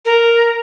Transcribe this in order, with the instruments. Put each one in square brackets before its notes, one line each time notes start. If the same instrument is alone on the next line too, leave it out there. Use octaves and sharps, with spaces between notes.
[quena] A#4